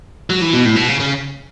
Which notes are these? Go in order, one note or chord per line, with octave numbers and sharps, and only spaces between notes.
F#3
E3
B2
A2
B2
C#3
C#3